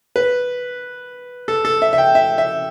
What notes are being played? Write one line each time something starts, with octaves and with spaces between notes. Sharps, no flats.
B4
A4
A4
E5
E5
G5
E5
E5